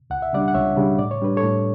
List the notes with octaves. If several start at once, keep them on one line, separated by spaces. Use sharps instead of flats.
C#2 F#5
E5
C#3 G3 D4 D5 F#5
F#5
C#2 C#5 E5
C#3 G3 D4
A2 D5
C#5
G3 D4 B4
A4 C#5
A2